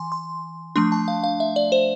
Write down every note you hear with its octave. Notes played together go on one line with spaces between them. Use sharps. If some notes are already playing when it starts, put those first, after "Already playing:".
Already playing: E3 G#5 C6
C6
F3 A3 D4 C6
A5
F5
F5
E5
D5
C5